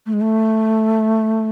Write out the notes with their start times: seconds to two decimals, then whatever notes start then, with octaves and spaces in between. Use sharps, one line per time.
0.06 A3
0.13 G#3
0.21 A3